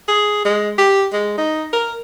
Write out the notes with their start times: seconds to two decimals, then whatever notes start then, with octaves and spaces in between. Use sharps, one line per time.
0.08 G#4
0.45 G#3
0.78 G4
1.13 G#3
1.38 D#4
1.73 A#4